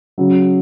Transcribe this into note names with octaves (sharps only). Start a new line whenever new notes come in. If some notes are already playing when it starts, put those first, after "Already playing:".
C#3 F#3